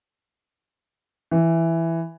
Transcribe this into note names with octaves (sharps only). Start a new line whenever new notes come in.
E3